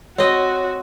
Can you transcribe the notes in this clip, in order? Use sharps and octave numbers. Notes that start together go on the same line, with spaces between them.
C4 F#4 C#5 D#5